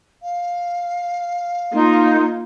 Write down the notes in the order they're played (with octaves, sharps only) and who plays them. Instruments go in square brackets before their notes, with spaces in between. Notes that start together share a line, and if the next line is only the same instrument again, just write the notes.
[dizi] F5
[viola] A#3 F4 [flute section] D#4 C6